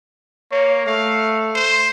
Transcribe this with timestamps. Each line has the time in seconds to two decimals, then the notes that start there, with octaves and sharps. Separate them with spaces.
0.52 A#3 C#5
0.86 A3 F5
1.55 C5